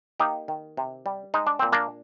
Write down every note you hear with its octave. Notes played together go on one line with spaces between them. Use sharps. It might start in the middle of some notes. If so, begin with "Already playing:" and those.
A#3 D#4 G4
D#3
C3
G3
G#3 D#4
D4
A#2 C4
A#3 D4